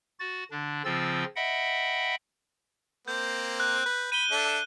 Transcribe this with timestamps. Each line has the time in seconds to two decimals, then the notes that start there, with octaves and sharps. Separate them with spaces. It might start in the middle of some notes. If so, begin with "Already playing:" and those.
0.20 F#4 A6
0.51 D3 D4
0.85 C#3 F3 C4 F4 E6 A6
1.36 D#5 E5 F#5 G5 B5
3.08 A#3 C4 G6
3.60 F#6
3.86 B4
4.12 B5 D#7 G7
4.31 D4 A4 E5